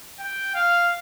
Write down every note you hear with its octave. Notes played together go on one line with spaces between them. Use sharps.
G5
F5